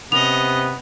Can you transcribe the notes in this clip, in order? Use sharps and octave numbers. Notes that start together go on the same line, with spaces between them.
C3 B3 C#4 D#5 F7